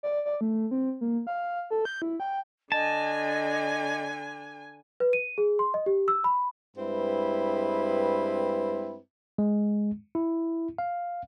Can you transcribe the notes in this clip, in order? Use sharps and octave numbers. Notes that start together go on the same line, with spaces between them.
D5
D5
A3
C4
A#3
F5
A4
G6
E4
G5
D3 D#5 G#5 A5
B4
D#7
G#4
C6
D#5
G4
E6
B5
G2 G#3 C4 E4 B4
G#3
E4
F5